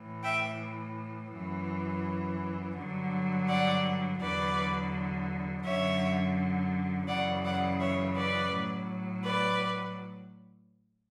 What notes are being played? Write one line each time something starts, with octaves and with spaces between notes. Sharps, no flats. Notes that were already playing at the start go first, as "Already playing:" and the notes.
Already playing: A2 E3
E5 G5
F#2 E3
G2 D3 F#3
D5 F#5
E2 D3 F#3 B4 D5
F#2 D3 F#3 C#5 E5
F#2 C#3 E3 D5 F#5
D5 F#5
C#5 E5
B4 D5
A2 F#3
B4 D5